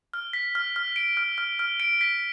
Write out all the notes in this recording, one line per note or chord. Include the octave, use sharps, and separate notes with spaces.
F6
B6
F6
F6
D7
F6
F6
F6
D7
B6